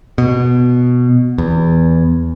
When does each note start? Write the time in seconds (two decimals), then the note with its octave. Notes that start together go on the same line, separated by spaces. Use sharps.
0.18 B2
1.38 E2